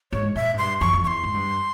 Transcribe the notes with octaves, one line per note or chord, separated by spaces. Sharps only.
G#2 C#5
A#2 E5
G#2
G2 C6
F2 C#6
F2
E2 C6 C#6
G#2
G2